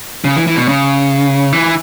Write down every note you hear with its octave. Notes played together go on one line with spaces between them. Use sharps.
C#3
E3
E3
B2
C#3
E3